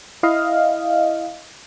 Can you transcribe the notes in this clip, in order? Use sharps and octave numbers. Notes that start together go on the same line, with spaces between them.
E4 D#5 F5